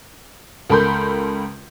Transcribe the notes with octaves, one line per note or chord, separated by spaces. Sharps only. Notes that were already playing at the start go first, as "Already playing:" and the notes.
C#2 A4 A#4 B5 C6 G6